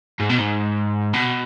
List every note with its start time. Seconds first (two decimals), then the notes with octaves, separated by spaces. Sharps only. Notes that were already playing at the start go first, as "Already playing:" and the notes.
0.20 G#2
0.30 B2
0.39 G#2
1.14 B2